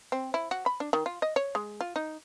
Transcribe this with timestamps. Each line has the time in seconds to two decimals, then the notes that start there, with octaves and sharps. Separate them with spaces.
0.12 C4
0.34 E4
0.51 F#4
0.66 B5
0.80 D4
0.93 D#3
1.06 F4
1.22 D#5
1.36 C#5
1.55 G#3
1.81 F4
1.96 D#4